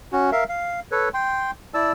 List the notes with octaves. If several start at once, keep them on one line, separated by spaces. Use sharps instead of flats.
C#4 F#4
A#4 E5 F5
F5
A4 B4 C#5
G5 C6
E4 D5 A5 E6